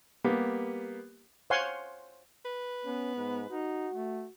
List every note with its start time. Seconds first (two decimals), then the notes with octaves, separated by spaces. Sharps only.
0.24 G3 A#3 B3 G4
1.50 C5 C#5 F5 F#5 G#5 C6
2.45 B4
2.85 B3 C#4
3.16 G#2
3.50 D#4 F#4
3.93 A3